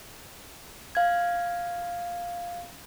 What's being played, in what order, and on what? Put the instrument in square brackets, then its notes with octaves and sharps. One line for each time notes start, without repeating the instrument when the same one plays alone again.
[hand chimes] F5 G#6